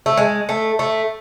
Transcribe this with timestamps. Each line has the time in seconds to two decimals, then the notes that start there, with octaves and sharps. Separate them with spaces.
0.06 A3
0.17 G#3
0.49 A3
0.79 A3